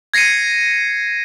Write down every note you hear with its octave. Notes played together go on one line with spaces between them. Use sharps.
G#6 A#6 C7 C#7 D#7